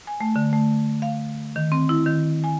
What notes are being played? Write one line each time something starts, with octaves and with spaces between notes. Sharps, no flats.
G#5
A3
D3
A3
F5
D#3
C4
E4
D#3
G#5